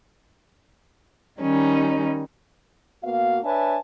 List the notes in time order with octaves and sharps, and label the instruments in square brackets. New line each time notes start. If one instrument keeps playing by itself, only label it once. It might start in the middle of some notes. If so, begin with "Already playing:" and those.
[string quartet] D#3 G3 C#4 D#4
[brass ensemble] B2 A#3 B3 F#4 F5
D4 B4 C#5 E5 G#5 A5